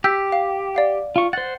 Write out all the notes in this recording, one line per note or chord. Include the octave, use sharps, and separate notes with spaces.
G4 E6 G6 B6
F5
D5 F5 F#5
F4 C#6
C5 F#5 A6